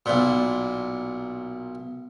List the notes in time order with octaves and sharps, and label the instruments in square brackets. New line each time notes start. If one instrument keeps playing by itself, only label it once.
[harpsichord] B1 A#2